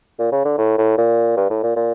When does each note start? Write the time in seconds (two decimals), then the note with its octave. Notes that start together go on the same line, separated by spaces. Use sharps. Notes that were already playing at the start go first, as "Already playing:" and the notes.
0.19 A#2
0.32 C#3
0.45 D3
0.58 A2
0.78 A2
0.98 A#2
1.37 G2
1.50 A2
1.63 A#2
1.76 A#2